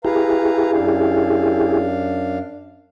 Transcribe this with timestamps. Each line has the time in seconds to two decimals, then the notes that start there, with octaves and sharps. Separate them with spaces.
0.05 E4 G4 G#4 B4 F5 A#5
0.72 F#2 D4 F5